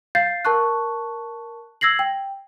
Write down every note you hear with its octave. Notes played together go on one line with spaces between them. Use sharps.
F5 G6 A6 C7
A#4 A5 C#6 F#6
E6 G#6 A#6 C7 F#7
G5